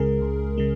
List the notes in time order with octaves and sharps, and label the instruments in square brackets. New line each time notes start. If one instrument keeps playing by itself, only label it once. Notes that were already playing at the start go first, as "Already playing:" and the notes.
Already playing: [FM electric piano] C#2 C#3 G#3 G#4 A#4
C#2
C#3 G#3